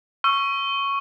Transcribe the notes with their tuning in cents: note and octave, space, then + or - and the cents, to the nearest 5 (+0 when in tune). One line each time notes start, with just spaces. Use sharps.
C#6 +0 E6 +40